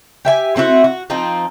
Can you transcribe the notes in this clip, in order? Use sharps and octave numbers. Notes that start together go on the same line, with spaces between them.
G4 E5 G#5
A3 C4 E4 F#4
F#4
F3 C4 D#4